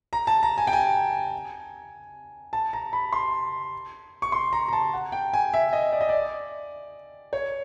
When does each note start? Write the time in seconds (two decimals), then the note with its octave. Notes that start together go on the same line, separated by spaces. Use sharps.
0.13 A#5
0.27 A5
0.43 A#5
0.58 G#5
0.67 G5
0.73 G#5
2.53 A5
2.73 A#5
2.93 B5
3.12 C6
4.22 C#6
4.32 C6
4.53 A#5
4.68 A#5
4.73 A5
4.93 F#5
5.12 G5
5.33 G#5
5.53 E5
5.73 D#5
5.92 D5
6.01 D#5
6.09 D5
7.33 C#5